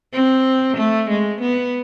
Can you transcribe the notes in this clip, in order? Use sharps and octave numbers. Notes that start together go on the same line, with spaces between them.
C4
A3
G#3
B3